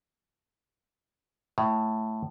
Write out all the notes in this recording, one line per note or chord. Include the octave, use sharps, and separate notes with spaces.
A2